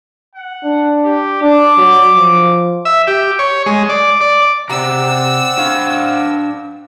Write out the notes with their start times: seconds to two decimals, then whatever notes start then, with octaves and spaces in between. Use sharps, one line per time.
0.35 F#5
0.64 D4
1.05 G4
1.42 D4 D6
1.77 F#3
2.15 F3
2.85 E5
3.07 G4
3.39 C#5
3.66 G#3
3.89 D5
4.21 D5
4.69 C3 C4 D5 F#5 A#5 E6
5.58 D4 F5